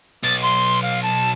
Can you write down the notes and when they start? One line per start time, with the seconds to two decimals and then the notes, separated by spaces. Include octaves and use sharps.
0.24 B1 A6
0.43 C6
0.82 F5
1.03 A5